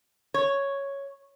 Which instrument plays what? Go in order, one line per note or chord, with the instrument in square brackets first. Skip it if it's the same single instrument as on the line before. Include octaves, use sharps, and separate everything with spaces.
[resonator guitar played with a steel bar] C#5